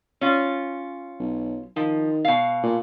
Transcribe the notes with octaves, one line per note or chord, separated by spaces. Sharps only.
C#4 F4
B1
D#3 F3
B2 F5
A#2